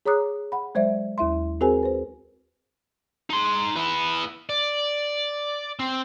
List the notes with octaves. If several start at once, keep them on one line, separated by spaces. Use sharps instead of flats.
G#4 C#5 A#5 D6 D#6 F#6
F#5 B5
F#3 G#3 C5 D5 E5
D#2 E4 E5 C6
C4 F#4 G#4 A#4 C5 G#5
B4 C5
D#4 C6
B3 E4
D5
C4